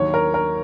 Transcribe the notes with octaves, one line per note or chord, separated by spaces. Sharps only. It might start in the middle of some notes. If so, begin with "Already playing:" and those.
Already playing: D#2 D#3 F#3 C#5
A#4
A#4